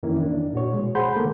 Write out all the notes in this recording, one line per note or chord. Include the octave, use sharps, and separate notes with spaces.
F2 D#3 E3 A#3 C#4 E4
D4
A#2 F#4 C#5
B2 G#3
G#4 C5 F#5 B5 C6 G6
D#3 A3 A#3 A4